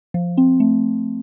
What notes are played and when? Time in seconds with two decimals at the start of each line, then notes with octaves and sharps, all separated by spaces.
0.14 F3
0.38 C4
0.60 A3